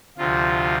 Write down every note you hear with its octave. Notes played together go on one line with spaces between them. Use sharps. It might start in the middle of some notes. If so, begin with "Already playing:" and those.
D2 C3 F3 F4